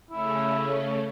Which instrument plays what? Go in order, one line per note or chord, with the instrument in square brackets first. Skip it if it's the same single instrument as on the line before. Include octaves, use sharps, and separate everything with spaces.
[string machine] C#3 A3 C#4 [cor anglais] E4